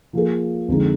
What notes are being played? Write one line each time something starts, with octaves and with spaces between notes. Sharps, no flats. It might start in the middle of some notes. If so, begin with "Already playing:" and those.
F3 A#3 F4 G#4
F2 D3 G#3 C4 D#4